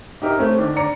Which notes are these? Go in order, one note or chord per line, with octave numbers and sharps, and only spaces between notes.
D#4 G4 A#4 E5
A3 C4 C#4
D3 D#3 D4
D5 A#5 C#7